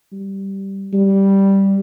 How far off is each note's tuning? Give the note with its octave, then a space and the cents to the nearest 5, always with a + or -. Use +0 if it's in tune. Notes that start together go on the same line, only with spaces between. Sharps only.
G3 -5
G3 -5